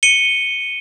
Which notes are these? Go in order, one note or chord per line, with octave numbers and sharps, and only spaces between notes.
C#7 D#7 G7